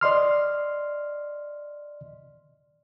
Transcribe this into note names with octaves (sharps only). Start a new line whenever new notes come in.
D5 D#5 C6 F6